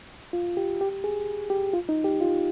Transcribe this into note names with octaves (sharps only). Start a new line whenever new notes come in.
F4
G4
G4
G#4
G4
F4
D#4
G4
F4